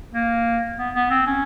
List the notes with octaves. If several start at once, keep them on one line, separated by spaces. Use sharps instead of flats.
A#3
B3
B3
C4
C#4